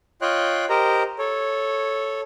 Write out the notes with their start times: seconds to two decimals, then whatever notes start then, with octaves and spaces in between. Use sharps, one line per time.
0.22 F4 C#5 D#5 G5 C6 F#6
0.70 G4 A#4 C5 D#5 A#5
1.19 A4 C#5